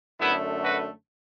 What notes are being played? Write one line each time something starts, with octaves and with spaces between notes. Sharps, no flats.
F#2 D3 A3 B3 E4
F#4 B4